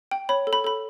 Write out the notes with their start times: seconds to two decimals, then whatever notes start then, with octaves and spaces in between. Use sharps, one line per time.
0.11 G5
0.29 C#5 B5
0.47 A4
0.53 B5
0.64 A4 B5